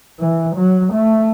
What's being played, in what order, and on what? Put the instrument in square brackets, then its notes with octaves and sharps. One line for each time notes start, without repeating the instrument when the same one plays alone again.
[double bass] E3
F#3
A3